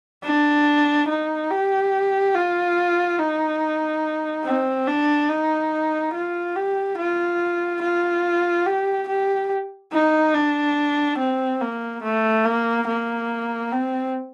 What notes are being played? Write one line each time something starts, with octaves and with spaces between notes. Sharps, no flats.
D4
D#4
G4
F4
D#4
C4
D4
D#4
F4
G4
F4
F4
G4
G4
D#4
D4
C4
A#3
A3
A#3
A#3
C4